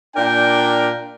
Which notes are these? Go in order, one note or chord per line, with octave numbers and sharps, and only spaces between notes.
A#2 D4 A#4 D5 G5